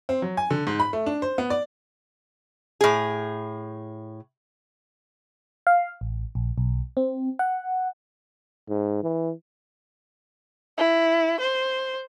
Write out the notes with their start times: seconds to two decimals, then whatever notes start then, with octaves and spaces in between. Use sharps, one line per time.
0.09 C4
0.22 F#3
0.37 G#5
0.51 D3
0.67 G#2
0.80 B5
0.93 A3
1.06 D4
1.22 C5
1.38 B3
1.50 D5
2.81 A2 G#4
5.67 F5
6.01 A1
6.35 A#1
6.58 B1
6.97 C4
7.39 F#5
8.69 G#2
9.03 E3
10.77 E4
11.40 C5